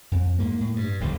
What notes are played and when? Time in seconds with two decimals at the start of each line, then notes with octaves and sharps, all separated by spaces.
0.12 F2
0.39 G#2 A#3
0.61 A2
0.76 G2
1.00 D#1 A#1 D3